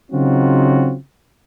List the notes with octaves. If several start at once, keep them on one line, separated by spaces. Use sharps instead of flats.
C#3 F#3 C4 D#4 F4 F#4